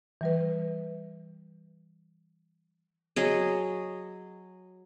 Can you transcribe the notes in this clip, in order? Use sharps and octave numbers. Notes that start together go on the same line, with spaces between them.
E3 G3 B4
F#3 G#4 D#5